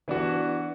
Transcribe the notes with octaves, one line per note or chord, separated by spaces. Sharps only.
E3 B3 D4 F#4